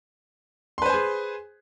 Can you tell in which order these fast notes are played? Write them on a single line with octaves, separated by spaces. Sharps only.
C6 B4 C5 G#5 G#4